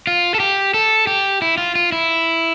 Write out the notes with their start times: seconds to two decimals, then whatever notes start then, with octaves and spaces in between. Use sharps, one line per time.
0.07 F4
0.34 A4
0.40 G4
0.74 A4
1.07 G4
1.42 E4
1.58 F4
1.75 F4
1.92 E4